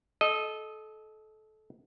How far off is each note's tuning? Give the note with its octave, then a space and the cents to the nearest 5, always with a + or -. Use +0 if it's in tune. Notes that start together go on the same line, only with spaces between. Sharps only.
A4 -25 D#5 +0